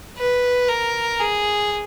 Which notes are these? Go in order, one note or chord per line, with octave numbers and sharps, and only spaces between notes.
B4
A#4
G#4